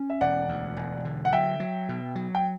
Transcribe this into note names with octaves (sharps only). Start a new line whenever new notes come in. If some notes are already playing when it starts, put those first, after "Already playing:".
Already playing: C#4
E5
E1 D5 F#5
D2
E1
D3
F#5
F#3 E5 G5
F#3
B2
F#3
G5